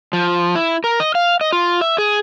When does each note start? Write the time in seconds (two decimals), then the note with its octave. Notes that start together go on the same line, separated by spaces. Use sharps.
0.13 F3
0.55 E4
0.84 A#4
1.00 D#5
1.15 F5
1.41 D#5
1.53 F4
1.81 E5
1.98 G#4